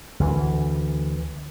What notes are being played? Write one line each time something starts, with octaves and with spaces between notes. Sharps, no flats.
D2 E3